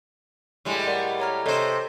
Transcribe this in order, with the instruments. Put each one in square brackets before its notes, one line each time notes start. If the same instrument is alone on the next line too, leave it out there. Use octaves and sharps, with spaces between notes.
[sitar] A2 G3 G#3
[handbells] A#4 D5 F#5
C#5 A#5 F6
[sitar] C3 C5 [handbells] A4 C#5 D#5